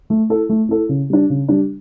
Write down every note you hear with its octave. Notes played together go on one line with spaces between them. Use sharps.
A3
E4 A4
A3
E4 A4
C#3
G3 D4
C#3
G3 D4